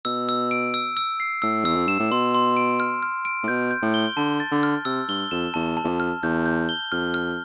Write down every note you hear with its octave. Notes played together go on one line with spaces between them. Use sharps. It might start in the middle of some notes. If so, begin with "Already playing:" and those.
B2 E6
E6
D7
E6
E6
C7
A2 E6
E2 E6
F2
G2 E7
A2
B2 C6
C6
D7
F6
F6
D7
A2
B2 G6
G6
A2
G7
D3 A5
A6
D3
F6
C3 E6
G2 G7
F2 E7
E2 A5
A5
E2
F2
F6
E2 G6
G6
G7
F2 F6
F6